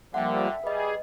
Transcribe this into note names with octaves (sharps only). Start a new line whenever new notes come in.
D3 F3 G3 A#3 E5 F#5 G5
G3 G#4 B4 D#5